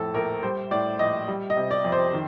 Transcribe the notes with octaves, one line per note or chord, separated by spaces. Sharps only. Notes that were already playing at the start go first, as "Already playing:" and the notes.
Already playing: F2 A2 F3 A4
A#1 A#4
G3 C5
A2 D5
A#1 D#5
G3
D#5
C3
D5
F2
C5
D#3